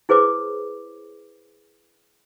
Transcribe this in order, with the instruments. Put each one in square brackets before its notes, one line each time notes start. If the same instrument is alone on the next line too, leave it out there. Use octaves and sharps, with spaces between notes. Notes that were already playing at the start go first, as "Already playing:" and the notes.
[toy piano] E4 G#4 B4 C5 D6